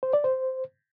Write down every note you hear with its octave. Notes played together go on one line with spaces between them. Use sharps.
C5
D5
C5